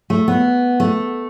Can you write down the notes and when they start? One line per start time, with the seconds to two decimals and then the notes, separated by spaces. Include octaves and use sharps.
0.10 A3
0.28 B3
0.80 A3